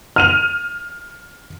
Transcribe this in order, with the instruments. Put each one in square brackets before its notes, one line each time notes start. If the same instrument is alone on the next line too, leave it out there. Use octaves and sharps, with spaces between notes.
[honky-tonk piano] F6 D#7 F7